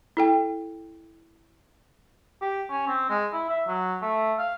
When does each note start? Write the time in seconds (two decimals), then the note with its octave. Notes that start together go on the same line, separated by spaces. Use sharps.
0.17 E4 A4 G5
2.42 G4
2.70 C#4
2.88 C4
3.10 G#3
3.33 E4
3.50 E5
3.68 F#3
4.02 A3
4.39 F5